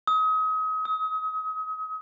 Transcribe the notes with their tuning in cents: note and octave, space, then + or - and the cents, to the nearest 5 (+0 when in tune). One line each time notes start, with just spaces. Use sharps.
D#6 +35
D#6 +45